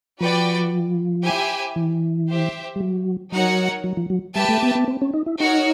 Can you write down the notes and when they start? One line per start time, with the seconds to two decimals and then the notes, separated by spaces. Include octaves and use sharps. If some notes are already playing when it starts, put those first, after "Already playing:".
0.20 F3 F#4 B4 D5 G5
1.24 E4 G4 C5 E5 G#5
1.76 E3
2.28 G4 C5 E5
2.76 G3
2.80 F#3
3.32 F#3 D#4 F#4 A#4 C#5 F#5
3.84 F#3
3.97 F3
4.10 F#3
4.35 G3 G4 B4 E5 A5
4.48 A3
4.62 B3
4.75 B3
4.88 C4
5.01 C#4
5.14 D#4
5.26 E4
5.39 D#4 F#4 A#4 C#5 F#5